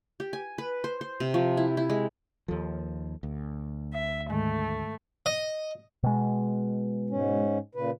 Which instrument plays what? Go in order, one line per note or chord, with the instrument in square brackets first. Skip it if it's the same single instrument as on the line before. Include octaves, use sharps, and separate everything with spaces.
[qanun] G4
G#5
B4
C5
C5
C3
F3
E4
E4
G#3
[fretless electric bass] D#2 F3 [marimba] A4
[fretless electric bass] D2
[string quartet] E5
[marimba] G#2 D#3 G#3 [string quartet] A3
[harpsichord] D#5
[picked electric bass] B2 G#3
[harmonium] G#2 C#4
A#2 C#3 B4